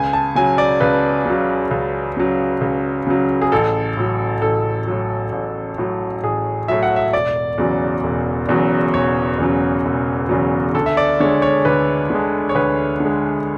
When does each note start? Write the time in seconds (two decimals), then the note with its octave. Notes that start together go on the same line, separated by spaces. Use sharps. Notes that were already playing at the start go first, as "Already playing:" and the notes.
Already playing: C#2 G#5
0.13 A5
0.35 C#3 F#3 G#5
0.58 D5
0.80 C#2 B4
1.26 C#3 F#3
1.71 C#2
2.17 C#3 F#3
2.61 C#2
3.07 C#3 F#3
3.42 G#4
3.52 A1 A4
3.97 A2 F#3
4.42 A1 A4
4.87 A2 F#3
5.32 A1
5.78 A2 F#3
6.23 A1 G#4
6.68 A2 F#3 E5
6.83 F#5
6.96 E5
7.13 E1 D5
7.58 E2 C#3 F#3
8.04 E1
8.49 E2 C#3 F#3
8.94 E1 C#5
9.39 E2 C#3 F#3
9.85 E1
10.29 E2 C#3 F#3
10.74 D2 A4
10.86 E5
10.97 D5
11.20 D3 G#3 C#5
11.42 C#5
11.65 D2 B4
12.10 D3 G#3
12.49 C#5
12.55 D2 B4
13.00 D3
13.05 G#3